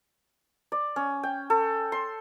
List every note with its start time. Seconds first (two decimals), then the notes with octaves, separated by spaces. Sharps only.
0.72 D5
0.96 C#4
1.23 G5
1.50 A4
1.92 C6